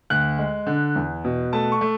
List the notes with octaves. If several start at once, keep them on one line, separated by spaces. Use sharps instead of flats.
D2 F#6
G#3
D3
E2
B2
A3 A5
C#6
A3